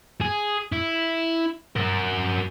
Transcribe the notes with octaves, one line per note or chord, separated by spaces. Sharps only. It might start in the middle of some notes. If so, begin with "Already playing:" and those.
G#4
E4
F#4 A#4